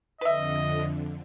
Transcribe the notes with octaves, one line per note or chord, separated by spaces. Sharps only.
F2 D3 B4 D#5 E5